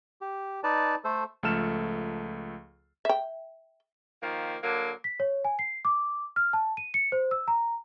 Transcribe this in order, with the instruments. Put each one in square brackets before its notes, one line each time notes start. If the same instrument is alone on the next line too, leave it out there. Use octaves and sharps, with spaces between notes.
[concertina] G4
D#4 B4 D5 A5
A3 A4 C5
[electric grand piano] C#2 F3 A3 A4 F6 E7
[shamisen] E5 G5
[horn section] D#3 F3 A#3
D3 F#3 A#3
[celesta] B6
C#5
G#5
C7
D6
F6
A5
D#7
C#7
C5
E6
A#5